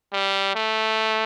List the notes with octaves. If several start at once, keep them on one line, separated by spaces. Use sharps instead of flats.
G3
A3